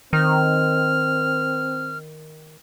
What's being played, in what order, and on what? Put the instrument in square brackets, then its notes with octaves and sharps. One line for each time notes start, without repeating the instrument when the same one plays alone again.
[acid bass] D#3 [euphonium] C4 [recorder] F6